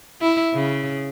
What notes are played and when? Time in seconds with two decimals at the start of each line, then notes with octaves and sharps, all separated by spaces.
0.22 E4
0.54 C#3